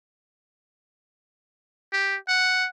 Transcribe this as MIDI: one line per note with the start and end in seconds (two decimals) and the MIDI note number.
1.93 2.16 67
2.28 2.67 78